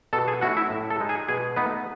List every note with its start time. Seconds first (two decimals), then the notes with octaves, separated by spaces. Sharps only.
0.13 B2 A4 A5
0.28 G#4 G#5
0.41 A3 C#4 E4 F#4 F#5
0.57 E4 E5
0.70 A2
0.90 A4 A5
1.00 G#3 D#4
1.09 G#4 G#5
1.28 B2 G#4 G#5
1.56 A3 B3 D#4 B4